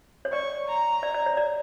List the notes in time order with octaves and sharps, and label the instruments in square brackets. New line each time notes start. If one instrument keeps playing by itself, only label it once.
[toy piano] C#5
[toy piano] D5 [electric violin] C#6
[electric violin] A#5
[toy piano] D5
D5
C#5
D5